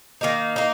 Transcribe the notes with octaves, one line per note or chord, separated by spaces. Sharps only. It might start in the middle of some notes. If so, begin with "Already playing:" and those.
D#3 A#3 D#4
A#3 D#4